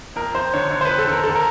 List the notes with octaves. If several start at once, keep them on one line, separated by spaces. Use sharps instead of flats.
F2 A#4
F2 C5
D3 C#5
D3 C#5
C5
F2 B4
A4
D3 A#4
D3 A4
A#4